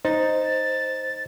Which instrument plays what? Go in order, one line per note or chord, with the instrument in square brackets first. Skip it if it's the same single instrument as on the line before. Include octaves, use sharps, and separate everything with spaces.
[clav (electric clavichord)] D#4 [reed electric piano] C5 [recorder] A6